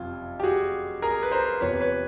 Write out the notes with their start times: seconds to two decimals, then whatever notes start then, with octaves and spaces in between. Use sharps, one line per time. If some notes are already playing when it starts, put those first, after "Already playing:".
Already playing: F#1 F2 C3 F4
0.40 G4
0.43 F#4 G#4
1.02 G#4 A#4
1.23 B4
1.32 A#4 C5
1.61 E2 C3 F3 B4 C#5
1.81 B4 C#5